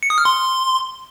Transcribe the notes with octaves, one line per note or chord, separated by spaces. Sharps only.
C#7
D#6
F6
C6